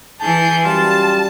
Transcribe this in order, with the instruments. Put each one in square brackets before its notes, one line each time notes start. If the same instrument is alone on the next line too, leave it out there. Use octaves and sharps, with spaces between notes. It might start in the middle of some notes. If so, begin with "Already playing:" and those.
[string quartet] E3 G#4 G6 [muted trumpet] A5
[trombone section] F#2 G3 [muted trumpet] F4 [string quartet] A5